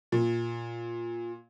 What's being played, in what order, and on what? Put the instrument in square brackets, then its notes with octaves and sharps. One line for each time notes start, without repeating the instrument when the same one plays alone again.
[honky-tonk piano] A#2